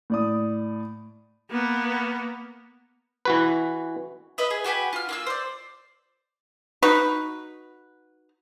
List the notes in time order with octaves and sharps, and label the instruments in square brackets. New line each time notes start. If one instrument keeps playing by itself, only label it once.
[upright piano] A2 D5 D#6
[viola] A#3 B3
[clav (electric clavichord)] E3 F#4 B4
[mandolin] B4 D#5 E5
G#4
F#4 G4 B4 G#5
F4 F6
A#3 F4 E6
C5 D5
[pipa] D#4 F#4 B4